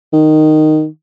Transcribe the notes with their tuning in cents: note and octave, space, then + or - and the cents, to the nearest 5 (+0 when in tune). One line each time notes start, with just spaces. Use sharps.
D#3 -10